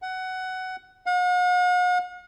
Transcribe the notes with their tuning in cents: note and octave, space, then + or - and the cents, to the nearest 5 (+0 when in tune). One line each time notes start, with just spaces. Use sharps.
F#5 +15
F#5 -45